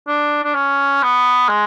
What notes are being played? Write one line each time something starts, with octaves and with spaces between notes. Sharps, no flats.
D4
D4
C#4
B3
G#3